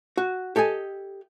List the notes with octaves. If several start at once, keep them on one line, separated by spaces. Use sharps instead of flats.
F#4
G4 A4 D#5 G#5